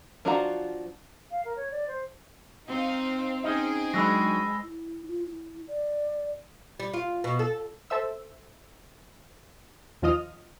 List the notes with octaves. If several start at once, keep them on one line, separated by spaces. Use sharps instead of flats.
F3 D4 F4 F#4 A#5
F5
A#4
C#5
D5
C5
C4 D#4 F5
C#4 D#4 G#4 C5 D#5 G5
F#3 G#3 D4 D#4 B5 E6 A#6
E4
F4
E4
D5
G3
F4
B2
A4
A4 C5 E5 E6
D#2 F3 F4 D#5 D#6 F6